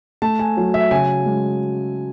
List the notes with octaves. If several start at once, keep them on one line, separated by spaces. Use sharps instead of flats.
A3 A5
G#5
F#3
E5
C#3 G#5
G#3